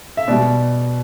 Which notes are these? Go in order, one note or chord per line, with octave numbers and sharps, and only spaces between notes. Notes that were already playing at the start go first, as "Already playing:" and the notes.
E5
B2 G3 D5